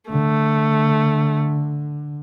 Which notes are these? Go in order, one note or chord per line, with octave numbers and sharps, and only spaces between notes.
D3 A3